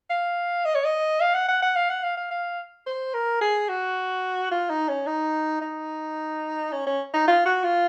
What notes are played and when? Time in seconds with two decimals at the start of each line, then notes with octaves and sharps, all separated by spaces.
0.10 F5
0.65 D#5
0.75 C#5
0.85 D#5
1.21 F5
1.34 F#5
1.48 F#5
1.62 F#5
1.76 F5
1.90 F#5
2.03 F5
2.17 F5
2.31 F5
2.86 C5
3.14 A#4
3.41 G#4
3.69 F#4
4.51 F4
4.70 D#4
4.89 C#4
5.07 D#4
5.61 D#4
6.72 C#4
6.87 C#4
7.14 D#4
7.28 F4
7.46 F#4
7.64 F4